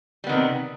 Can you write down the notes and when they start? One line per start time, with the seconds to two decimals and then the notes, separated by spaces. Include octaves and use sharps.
0.24 G3
0.27 B3
0.29 D#3
0.32 C3